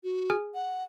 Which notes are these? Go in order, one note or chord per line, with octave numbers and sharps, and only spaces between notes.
F#4
G#4 G#5 F6
F#5